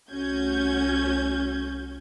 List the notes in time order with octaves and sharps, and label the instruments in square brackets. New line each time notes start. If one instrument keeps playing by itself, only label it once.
[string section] C2 A3 C#4 F#4 G6 G#6